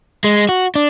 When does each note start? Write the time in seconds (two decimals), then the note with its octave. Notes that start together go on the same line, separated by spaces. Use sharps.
0.24 G#3
0.49 F#4
0.75 D4